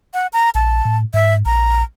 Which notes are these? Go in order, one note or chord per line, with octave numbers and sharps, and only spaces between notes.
F#5
A#5
A#1 A5
A2
G#2 E5
A#1 A#5